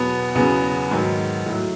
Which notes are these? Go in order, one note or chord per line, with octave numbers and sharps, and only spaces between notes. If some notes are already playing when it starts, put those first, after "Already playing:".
Already playing: E2 B2 F#3 B3
E2 C#3 F#3 B3
G#2 D#3 F#3
A2 F#3